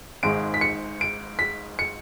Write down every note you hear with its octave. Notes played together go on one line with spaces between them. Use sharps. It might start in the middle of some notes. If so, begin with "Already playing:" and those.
G#1 G#2 G#3 D7
B6
C#7
D7
B6
C#7